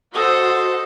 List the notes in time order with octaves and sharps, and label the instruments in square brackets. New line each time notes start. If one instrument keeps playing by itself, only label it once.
[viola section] F#4 C5 [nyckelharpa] A4 D#5